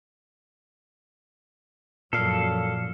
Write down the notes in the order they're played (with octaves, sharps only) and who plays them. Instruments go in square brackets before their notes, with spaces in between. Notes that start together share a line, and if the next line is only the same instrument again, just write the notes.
[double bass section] F#2 F3 F#3 [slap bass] A#2 [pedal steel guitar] A4 F5